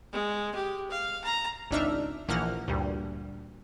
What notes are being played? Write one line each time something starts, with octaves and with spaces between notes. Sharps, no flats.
G#3
G4
F5
A#5
G#1 C#2 D4 D#4 E5 F6
A#1 E3 F3 A#3 F#5 F6
D2 G2 A#2 G3